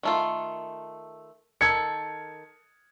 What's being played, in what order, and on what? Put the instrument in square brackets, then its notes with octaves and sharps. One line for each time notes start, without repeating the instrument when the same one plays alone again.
[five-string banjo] D#3 A3 F4
[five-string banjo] D#3 A4 [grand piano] G#6 C#7